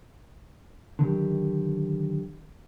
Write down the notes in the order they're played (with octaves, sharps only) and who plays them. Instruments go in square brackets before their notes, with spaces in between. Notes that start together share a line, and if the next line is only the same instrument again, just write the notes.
[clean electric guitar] D3 D#3 F#3 G4